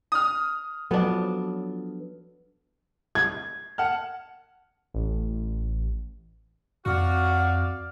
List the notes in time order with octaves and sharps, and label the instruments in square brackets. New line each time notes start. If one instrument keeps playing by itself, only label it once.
[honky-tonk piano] D#6 F6
[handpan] F3 F#3 A4 [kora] B3 D4
[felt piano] G#6
[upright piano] F#5 A5 F6
[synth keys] A1
[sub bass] F2 [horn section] F#4 [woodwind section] D5 F5